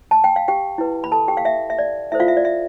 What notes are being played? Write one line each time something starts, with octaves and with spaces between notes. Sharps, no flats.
A5
G5
F5
G4 G5
E4 B4
B5
A4 A5
G4 G5
F5
E5
E5
D5
E4 A4 C5 E5
F4 F5
E5
D5
E5